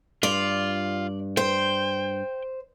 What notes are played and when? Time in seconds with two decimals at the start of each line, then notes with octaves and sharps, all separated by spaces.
0.23 G2 F4 D5
1.37 C5 G5